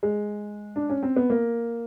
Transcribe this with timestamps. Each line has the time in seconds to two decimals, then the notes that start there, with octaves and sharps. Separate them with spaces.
0.03 G#3
0.76 D4
0.90 C#4
1.03 C4
1.16 B3
1.30 A#3